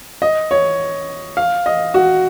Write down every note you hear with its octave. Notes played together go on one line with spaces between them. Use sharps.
D#5
C#5
F5
D#5
F#4